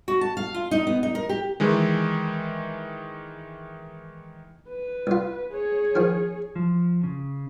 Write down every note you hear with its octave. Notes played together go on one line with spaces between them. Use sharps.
F#4
A5
F5
F4
D#4
B3
D#4
A#4
G4
D#3 E3 G#3
B4
C2 F4
G#4 C#5
D#3 F3
F3
C#3